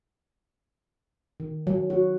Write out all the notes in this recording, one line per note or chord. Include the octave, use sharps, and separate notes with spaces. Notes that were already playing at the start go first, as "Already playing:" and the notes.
D#3
F#3
F#4